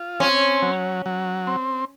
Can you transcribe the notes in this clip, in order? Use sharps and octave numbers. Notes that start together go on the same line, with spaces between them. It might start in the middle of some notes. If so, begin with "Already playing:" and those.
Already playing: F4
C4 C#4
F#3
F#3
C4